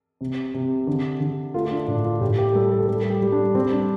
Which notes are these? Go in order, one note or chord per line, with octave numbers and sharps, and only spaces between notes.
C3
C3
D3
D3
A3 F4
F4
D4
A2 D4
F4
A2 G4
G4
G3 A4
A4
G3 A4
G4
G3
D4
G3 C4
D4